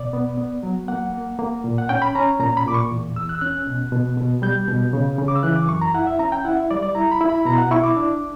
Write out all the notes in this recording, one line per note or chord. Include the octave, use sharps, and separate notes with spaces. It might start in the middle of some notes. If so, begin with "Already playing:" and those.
Already playing: B2 D5
B3
B3
F#3
A#3 F#5
A#3
A#3
A#2
F#5
C#4 G5
B5
C#4 A#5
A#2 A#5
B5
A#2 D6
C#6
E2
E2 E6
F#6
E6
C#4 F#6
B2
B2
B2
G3 G6
B2
C#3
C#3
D6
E6
E3 F#6
D6
F#2 C#6
A#5
E4 F#5
E5
C#4 A#5
G5
E4 F#5
E5
G3 D5
D5
E4 A#5
B5
E4
B5
B2 A#5
F#5
E4 C#6
D6
D4